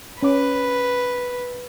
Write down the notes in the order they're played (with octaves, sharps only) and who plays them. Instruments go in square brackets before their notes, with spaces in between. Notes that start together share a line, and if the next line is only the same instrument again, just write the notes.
[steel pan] C#4 D6 [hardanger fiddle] B4